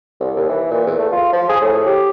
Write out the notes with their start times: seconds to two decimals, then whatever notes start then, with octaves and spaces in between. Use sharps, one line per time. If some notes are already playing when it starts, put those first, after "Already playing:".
0.20 C2
0.36 D#2
0.49 E3
0.71 A#2
0.87 E2
0.99 A3
1.12 F4
1.33 F3
1.49 G#4
1.62 A2
1.87 G4